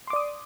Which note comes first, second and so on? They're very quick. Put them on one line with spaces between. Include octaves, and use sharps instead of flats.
C6 D6 D5 D#6